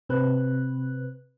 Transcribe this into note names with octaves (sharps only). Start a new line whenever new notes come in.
C3 C4 B4 F#6